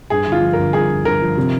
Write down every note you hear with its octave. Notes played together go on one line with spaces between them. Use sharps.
G2 G#4
G1
F4
F3
A#4
G1
G2 G#4
G1
G1 A#4
F3
C3